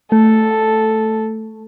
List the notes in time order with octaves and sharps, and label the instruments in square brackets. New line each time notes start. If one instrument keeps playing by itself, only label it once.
[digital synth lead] A3 [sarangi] A4